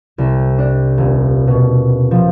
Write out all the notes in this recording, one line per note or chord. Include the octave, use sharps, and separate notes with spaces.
C2
D4
D#1
B2
F3